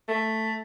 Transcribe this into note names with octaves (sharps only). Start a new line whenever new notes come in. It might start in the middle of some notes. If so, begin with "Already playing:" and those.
A3